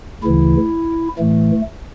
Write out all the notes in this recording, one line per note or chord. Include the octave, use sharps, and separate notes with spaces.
D2 C#3 E3 E4
A2 E3 A3